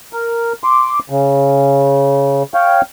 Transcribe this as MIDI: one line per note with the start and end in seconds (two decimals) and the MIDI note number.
0.13 0.53 70
0.64 0.99 84
0.64 0.99 86
1.10 2.43 49
2.54 2.81 73
2.54 2.81 77
2.54 2.81 79